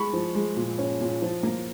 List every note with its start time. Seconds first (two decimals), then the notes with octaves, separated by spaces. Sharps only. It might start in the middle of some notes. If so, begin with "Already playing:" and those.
Already playing: G#3 B5 C#6
0.13 F3
0.35 G#3
0.56 A#2
0.79 C#4
1.00 A#2
1.22 F3
1.43 A#3